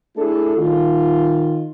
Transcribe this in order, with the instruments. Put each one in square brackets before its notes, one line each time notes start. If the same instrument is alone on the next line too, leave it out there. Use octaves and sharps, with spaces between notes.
[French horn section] A3 D4 E4 G#4 A4
D#3 F4